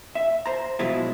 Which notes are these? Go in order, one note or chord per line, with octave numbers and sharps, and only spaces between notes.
E5
C5 A#5
B2 F3 F#3 G#3 E4 F4